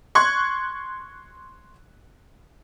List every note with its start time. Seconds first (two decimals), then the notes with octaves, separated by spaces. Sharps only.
0.15 C6 C#6 F#6 G#6